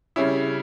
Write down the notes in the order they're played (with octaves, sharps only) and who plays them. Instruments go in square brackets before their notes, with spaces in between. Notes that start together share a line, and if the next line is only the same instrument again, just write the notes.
[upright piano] C#3 G3 C#4 E4